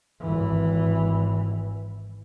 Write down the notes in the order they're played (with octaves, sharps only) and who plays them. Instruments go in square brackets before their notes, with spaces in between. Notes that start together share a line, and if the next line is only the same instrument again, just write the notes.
[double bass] G#1 E3